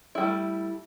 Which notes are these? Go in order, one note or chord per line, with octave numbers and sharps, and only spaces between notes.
G3 A3 E4